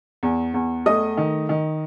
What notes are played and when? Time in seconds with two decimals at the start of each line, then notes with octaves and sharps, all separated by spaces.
0.23 E2
0.54 E2
0.86 A3 D#5 D#6
1.17 D#3
1.49 D#3